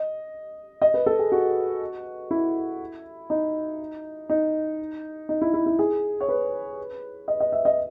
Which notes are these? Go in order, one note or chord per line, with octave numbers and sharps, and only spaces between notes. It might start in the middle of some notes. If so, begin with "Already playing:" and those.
Already playing: D#5
D#5
B4
A4
G#4
F#4
E4
D#4
D#4
D#4
E4
E4
E4
G#4
C#5
B4
D#5
D#5
E5
D#5